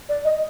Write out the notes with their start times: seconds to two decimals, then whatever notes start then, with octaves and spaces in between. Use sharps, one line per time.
0.09 D5
0.24 D#5